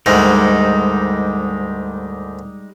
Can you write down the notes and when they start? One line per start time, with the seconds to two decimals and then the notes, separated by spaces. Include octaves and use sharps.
0.06 D2 G#2 D#3 G3 G#3 D#4